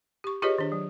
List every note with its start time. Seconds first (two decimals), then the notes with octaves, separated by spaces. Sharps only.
0.24 G4 C#6
0.42 F4 G4 G#4 B4 C#5 D#5
0.58 D#3 D4
0.72 F#3